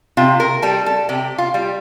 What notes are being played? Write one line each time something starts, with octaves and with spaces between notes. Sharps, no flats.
C3 F4
A#4
G3 A4
A4
C3 G4
F4
G3